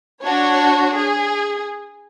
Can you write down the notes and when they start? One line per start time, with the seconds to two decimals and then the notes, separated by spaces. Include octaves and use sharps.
0.22 D4 F#4 C#5
0.94 G#4